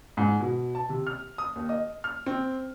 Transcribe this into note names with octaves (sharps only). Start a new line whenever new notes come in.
G#2
B2
A5
C3
F6
D#6
D#2
D#5
F6
C4